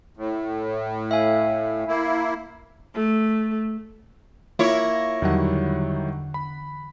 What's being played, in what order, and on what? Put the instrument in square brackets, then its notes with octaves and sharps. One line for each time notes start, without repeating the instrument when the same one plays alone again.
[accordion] A2
[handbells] E5 F5 G#5
[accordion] A#3 E4
[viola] A3
[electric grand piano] A#3 [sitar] E4 C#5 [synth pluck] F4 A#6
[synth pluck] E2 D3 F#5 [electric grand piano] D#3 F#3 G3
[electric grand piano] B5